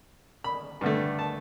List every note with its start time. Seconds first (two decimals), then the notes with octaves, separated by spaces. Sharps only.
0.44 B5
0.81 G2 D3 A3
1.19 A5